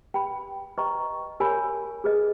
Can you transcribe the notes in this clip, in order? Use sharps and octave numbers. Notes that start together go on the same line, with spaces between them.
B4 G5 B5
B4 D#5 G5 A#5 C#6
A#4 C#5 G#5 B5
G#4 B4 D#5